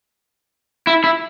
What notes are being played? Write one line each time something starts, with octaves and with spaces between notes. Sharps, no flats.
E4
E4